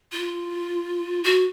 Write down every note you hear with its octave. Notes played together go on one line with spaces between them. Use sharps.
F4
F#4